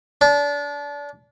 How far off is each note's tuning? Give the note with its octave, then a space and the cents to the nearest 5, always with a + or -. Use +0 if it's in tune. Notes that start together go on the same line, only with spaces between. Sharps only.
D4 -30